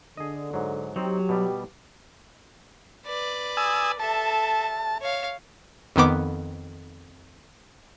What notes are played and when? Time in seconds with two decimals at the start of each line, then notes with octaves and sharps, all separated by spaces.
0.17 D3 G#4 D#5
0.54 G#2 F#3
0.96 F#3 C4 D#4 G4
1.29 B2 G3
3.06 B4 D5
3.57 G#5 D#6 E6
4.00 A4 E5 A5
5.02 C#5 F5
5.96 F2 D#3 B3 D6